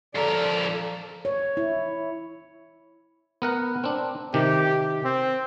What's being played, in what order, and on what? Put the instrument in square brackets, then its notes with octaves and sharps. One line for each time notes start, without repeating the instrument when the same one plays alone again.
[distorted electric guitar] F2 A#4 [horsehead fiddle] A4 D5
[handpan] C#5
E4
[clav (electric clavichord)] B3 A#4 F#5
C4 D4
[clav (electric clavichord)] C3 D#3 [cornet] G4
[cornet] C4